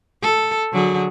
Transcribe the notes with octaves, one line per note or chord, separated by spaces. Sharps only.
A4
D3 F#3 G#4